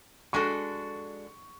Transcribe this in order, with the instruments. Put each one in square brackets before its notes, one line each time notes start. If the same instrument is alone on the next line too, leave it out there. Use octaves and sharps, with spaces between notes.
[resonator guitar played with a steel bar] G#3 D4 F#4 A4 [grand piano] C#6